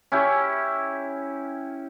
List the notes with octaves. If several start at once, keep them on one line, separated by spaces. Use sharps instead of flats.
C#4 E4 G4